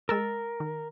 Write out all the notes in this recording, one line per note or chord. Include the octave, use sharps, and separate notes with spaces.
G#3 A#4 E6 A6
D#3